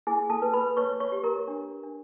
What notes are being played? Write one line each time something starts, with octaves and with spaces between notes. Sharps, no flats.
E4 G#4 G#5
A4 A5
B4
B4 B5
B4 C#5 C#6
C#5 C#6
G4
A#4 A#5
D4
D4